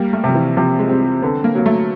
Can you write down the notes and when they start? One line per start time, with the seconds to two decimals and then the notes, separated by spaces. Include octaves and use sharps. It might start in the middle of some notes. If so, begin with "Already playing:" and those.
Already playing: G3 A#3
0.13 A3
0.24 C3 F3
0.35 E3
0.57 C3 F3
0.79 G#3
0.89 G3 C4
1.22 D3 B3
1.44 A#3
1.55 F#3 A#3
1.66 A3